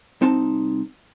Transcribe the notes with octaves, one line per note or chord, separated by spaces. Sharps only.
C2 C4 D#4 A5